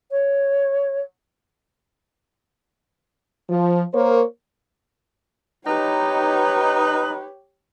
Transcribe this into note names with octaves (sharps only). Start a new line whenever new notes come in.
C#5
F3
A#3 A#4 C5 C#5
D#4 G4 B4 C#5